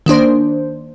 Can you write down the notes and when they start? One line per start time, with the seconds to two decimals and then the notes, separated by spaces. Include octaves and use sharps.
0.06 D#3 A#3 D4 C5